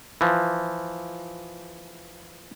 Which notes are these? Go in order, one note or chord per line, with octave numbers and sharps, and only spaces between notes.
E3 F3